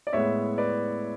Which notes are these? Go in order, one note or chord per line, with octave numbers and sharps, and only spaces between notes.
D5
A2 G#3 B3 C#5 E5
B4 D5